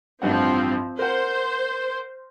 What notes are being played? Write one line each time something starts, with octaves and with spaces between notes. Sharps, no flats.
A1 G2 F3 C4 F#5
A#4 C5 F#5